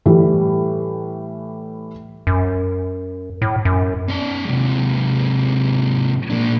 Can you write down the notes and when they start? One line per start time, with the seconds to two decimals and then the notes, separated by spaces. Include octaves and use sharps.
0.06 A2 E3 G3
2.27 F#2
3.42 A2
3.65 F#2
4.08 C#4 D5
4.45 G#2 C3
6.30 A#2 D4